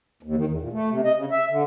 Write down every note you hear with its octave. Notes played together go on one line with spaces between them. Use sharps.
D#2
D#3
E2
A#2
A3
C3
D#5
C#3
E5
D3